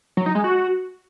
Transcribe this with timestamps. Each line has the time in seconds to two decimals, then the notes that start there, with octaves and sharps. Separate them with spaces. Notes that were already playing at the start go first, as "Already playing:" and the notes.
0.17 F#3
0.26 D#4
0.35 G#3
0.44 F#4